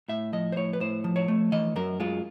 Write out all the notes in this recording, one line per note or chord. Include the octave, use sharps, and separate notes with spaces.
A2 E5
F3 D#5
C5
A2 C#5
B4
A2 C5
F3
C#5
A3
E3 D#5
F#2 A#4
G#3 F4